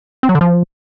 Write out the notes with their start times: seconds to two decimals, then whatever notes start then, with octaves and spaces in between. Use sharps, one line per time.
0.23 C4
0.29 F#3
0.35 D3
0.41 F3